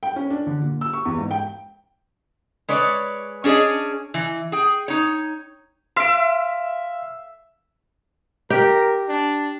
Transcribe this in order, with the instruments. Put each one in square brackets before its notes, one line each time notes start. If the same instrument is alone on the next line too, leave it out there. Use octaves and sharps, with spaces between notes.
[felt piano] G5
C#4
D4
D3
A#2
E6
C#6
E2
G#2
G5
[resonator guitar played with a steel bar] G#3 B4 C#5 D5
C#4 D4 G#4 C#5 D#5
E3
G#4 G5
D#4 C#5
[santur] E5 [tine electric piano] F5 [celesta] C6 D7
[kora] G4 [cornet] A#4
[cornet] D4